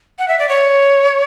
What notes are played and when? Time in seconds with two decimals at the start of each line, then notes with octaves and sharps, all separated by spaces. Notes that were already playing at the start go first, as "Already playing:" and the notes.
0.19 F#5
0.28 E5
0.39 D5
0.49 C#5